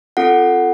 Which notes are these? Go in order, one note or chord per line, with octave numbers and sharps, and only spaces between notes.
C4 F4 A4 F#5